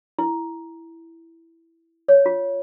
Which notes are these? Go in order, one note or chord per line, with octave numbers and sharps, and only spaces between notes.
E4
C#5
F4